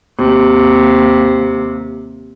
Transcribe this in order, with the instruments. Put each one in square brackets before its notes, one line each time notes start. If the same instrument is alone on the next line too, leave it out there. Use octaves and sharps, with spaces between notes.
[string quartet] D#2 C3